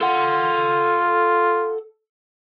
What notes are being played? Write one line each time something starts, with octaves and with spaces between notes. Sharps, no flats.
F4 A4 F#5